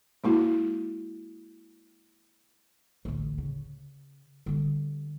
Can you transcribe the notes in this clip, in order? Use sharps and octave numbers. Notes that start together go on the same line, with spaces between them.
G#3 A#3 E4 F#4
A1 D2
C#3
D3 G3